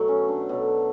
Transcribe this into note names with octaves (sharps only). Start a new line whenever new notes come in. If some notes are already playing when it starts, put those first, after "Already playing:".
Already playing: B2 F#3 A3
C#4
D4
B2 F#3 A3